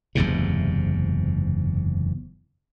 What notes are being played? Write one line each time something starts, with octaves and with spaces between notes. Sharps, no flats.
F#1 E2 G#2 C3